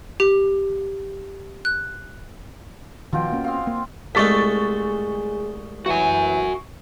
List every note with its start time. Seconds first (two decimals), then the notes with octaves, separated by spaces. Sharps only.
0.20 G4
1.65 F#6
3.13 B2 D#3 F3 F4 G5
3.32 A#3 C#4
3.44 C4 D#5 F5
3.67 A#3
4.15 C2 G#3 A3 G#4 C#6 A6 B6
5.86 E3 F#4 G#5